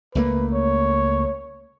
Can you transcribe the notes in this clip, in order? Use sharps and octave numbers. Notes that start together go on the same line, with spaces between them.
C#2 A3 A#3 B4
C#5